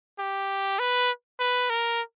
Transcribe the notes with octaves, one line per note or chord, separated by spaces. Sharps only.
G4
B4
B4
A#4